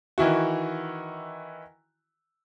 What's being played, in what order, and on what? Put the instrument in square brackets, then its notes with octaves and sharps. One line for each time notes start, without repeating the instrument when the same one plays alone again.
[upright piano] D#3 E3 E4 F#4